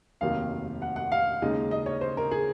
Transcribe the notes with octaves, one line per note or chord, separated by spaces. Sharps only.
F1 D#2 D#3 F#3 F5
F#5
F#5
F5
D#2 C#3 G#3 D#4
D#5
C#5
C5
A#4
G#4